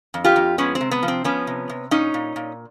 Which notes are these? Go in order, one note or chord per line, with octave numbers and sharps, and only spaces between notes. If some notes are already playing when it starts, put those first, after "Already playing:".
F2
F4 G4
F2
G#3 B3 C#4
C4
C3
B3
F3
C4
F3 B3 C#4
C3
C3
A#2 C#4 D#4
A#2
A#2